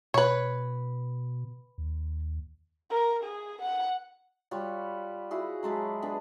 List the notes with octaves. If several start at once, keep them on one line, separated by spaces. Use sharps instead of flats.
B2 B4 C#5
D#2
A#4
G#4
F#5
G3 F4 C#5 F#5
E4 F#4 G#4
F#3 G#3 A5 B5
B3 D4 G#4